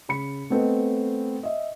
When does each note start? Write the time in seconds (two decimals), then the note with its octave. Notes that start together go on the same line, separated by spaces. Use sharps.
0.09 C#3 B5 C#7
0.50 A3 B3 C4 A4 B4 D#5
1.43 D#5 E5